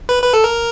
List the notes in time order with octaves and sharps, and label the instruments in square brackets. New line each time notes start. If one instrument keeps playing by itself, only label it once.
[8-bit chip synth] B4
B4
A4
A#4